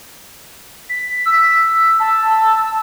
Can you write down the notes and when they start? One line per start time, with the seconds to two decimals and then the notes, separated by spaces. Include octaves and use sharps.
0.89 B6
1.26 E6
1.99 A5